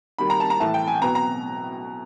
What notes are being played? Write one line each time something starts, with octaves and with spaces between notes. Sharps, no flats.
D#3 G3 A#3 B5
A#5
A5
A#5
A2 E3 A3 A5
G5
G#5
B2 F#3 B3 A#5
A#5